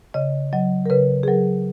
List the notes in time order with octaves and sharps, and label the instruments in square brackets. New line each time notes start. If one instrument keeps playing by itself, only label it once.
[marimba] C#3 D#5
F#3 D#5
A#4
C#3 B4
G#4
F#3 A#4